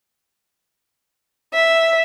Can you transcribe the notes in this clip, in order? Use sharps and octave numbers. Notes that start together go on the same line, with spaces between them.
E5